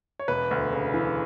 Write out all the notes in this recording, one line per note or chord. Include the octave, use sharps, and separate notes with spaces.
C#5
E1 B4
D2
C#3
E3